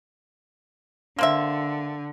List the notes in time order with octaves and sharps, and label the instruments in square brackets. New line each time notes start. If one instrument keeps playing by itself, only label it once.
[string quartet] D3 [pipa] A#3 C4 E5